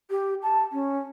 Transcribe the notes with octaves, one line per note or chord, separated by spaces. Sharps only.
G4
A5
C#4